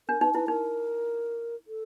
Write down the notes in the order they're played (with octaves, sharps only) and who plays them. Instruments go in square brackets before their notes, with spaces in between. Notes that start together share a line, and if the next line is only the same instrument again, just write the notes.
[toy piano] D4 [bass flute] A#4
[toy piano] D#4 [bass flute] B4
[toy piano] E4 [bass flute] B4
[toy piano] D#4 [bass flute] A#4
[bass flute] A4